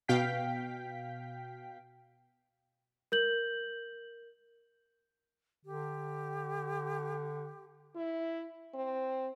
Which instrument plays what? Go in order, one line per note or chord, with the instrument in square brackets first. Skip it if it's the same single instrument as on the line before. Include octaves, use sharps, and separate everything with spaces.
[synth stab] B2 F5 G5 B6
[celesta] A#4 G6 F#7
[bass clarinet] D3 [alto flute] G4
[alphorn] E4
C4